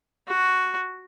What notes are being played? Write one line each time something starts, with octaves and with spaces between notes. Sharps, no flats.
F#4